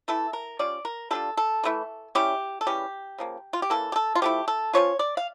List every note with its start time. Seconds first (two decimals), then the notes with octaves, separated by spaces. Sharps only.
0.08 E3 A3 E4 A4
0.33 A#4
0.59 G3 C#4 F4 D5
0.85 A#4
1.11 G3 D4 F4 A4
1.37 A4
1.64 E3 A3 E4
2.15 G3 C#4 E4 G4
2.61 A4
2.67 C#3 E3 G3 C#4 G4
3.18 C#3 F3 A#3
3.53 F4
3.62 G4
3.70 C#3 E3 A#3 A4
3.92 G4
3.96 A4
4.15 F4
4.22 F3 A3 E4 G4
4.48 A4
4.73 F3 A#3 C#4 F4 C#5
4.99 D5
5.17 F5